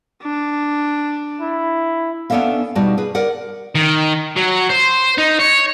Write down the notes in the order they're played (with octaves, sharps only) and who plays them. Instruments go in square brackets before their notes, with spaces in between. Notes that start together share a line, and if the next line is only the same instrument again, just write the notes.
[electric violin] D4
[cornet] E4
[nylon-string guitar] B3 C#4 D4 A4 E5 F5
B2 G3 D#4 F4 F#4 A5
G#4 B4
A#4 B4 D5 F#5
[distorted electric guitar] D#3
F#3
C5
D#4
C#5